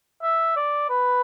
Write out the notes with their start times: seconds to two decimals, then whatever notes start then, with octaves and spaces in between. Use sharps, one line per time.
0.23 E5
0.56 D5
0.89 B4